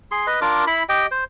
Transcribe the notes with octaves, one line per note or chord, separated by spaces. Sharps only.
G#4 C6
B4 D#5
D4 F4 A#4 D6
E4 B5
G4 D#5 G5
C5